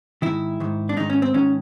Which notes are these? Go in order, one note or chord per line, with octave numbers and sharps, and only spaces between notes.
G#2 D#3 E4
G#2 D#3
D4
G#2 D#3 D#4
C#4
C4
G#2 D#3 C#4